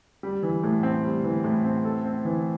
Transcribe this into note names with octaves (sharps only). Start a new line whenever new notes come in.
G3
E3
A2
C4
G3
E3
A2
C4
A4
C4
E3